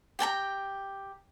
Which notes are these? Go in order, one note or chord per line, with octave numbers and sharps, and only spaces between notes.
G4 G5 A5 A#5